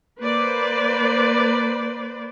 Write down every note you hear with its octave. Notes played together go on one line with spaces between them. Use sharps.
A#3 B4 C5 D5